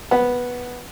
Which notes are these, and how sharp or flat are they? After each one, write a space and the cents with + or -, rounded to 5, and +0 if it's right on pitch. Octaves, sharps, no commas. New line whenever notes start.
B3 -5 F#5 +0